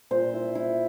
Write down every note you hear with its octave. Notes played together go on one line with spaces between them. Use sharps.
A#2 C5
E4
E4